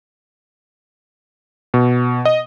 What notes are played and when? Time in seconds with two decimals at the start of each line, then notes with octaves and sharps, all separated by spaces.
1.74 B2
2.25 D#5